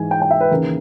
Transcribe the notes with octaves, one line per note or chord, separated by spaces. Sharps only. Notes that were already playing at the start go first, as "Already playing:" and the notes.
Already playing: G#2 E3 G#5
G5
G5
E5
B4
D#2 C#3 E3 A#4